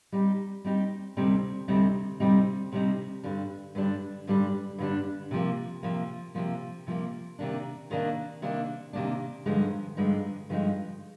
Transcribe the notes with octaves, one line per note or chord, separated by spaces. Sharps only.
G3 C4 D#4 G4
G3 C4 D#4 G4
D2 C3 G3 C4 D#4
D2 C3 G3 C4 D#4
D2 C3 G3 C4 D#4
D2 C3 G3 C4 D#4
G2 D3 G3 D4
G2 D3 G3 D4
G2 D3 G3 D4
G2 D3 G3 D4
C3 F3 A#3
C3 F3 A#3
C3 F3 A#3
C3 F3 A#3
C3 D#3 A#3 D4
C3 D#3 A#3 D4
C3 D#3 A#3 D4
C3 D#3 A#3 D4
G2 D3 F3 G#3 D#4
G2 D3 F3 G#3 D#4
G2 D3 F3 G#3 D#4